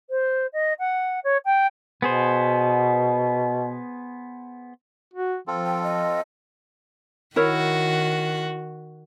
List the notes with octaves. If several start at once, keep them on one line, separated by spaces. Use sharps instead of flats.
C5
D#5
F#5
C#5
G5
B2 B3 G#4 C5
F#4
F3 C4 F4 A4
G5
D#5
D#3 E4 F#4 A#4 C#5